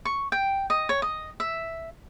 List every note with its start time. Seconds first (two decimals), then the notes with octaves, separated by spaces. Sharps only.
0.05 C#6
0.32 G5
0.70 D#5
0.89 C#5
1.02 D#5
1.40 E5